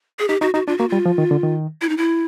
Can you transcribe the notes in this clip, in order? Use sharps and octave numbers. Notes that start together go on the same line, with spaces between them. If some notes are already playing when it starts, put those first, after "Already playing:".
G#4
D#4 G4
D#4 F#4
D#4 F#4
D4 F4
A#3 F#4
G3 F4
F3
D#3
D3
D#3
E4
D#4
E4